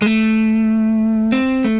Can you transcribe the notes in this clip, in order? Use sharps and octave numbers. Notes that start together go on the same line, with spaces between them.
G#3
A3
C4
A3